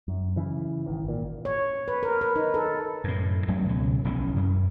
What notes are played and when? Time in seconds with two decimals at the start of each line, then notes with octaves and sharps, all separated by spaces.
0.08 F#2
0.36 C#3 E3
0.86 G#1 D#3 E3
1.05 G#1 A#2
1.45 C#5
1.88 B4
2.03 A#4
2.21 B4
2.36 D#4
2.54 A4
3.04 F#2 A2
3.48 G#2 F#3 A3 C#4
3.69 C#2 B2 C#4
4.04 F1 B1 E3 C#4
4.36 F#2